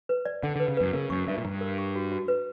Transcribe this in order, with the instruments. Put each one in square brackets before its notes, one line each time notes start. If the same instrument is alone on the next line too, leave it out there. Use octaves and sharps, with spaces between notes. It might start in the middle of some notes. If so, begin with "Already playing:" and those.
[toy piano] B4
D5
[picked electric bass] D3 [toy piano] F#5
[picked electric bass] D3
[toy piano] B4
[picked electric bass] C#3
[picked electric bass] F#2 [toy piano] B4
[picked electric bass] C#3 [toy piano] A#4
[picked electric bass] F#2 [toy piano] C#6
[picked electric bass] G2 [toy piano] E5
[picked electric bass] A#2
[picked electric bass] G2 [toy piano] A#5
[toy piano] A#4
C#6
F#4
F#4
B4